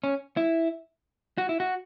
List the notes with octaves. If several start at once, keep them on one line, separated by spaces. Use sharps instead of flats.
C#4
E4
F#4
E4
F#4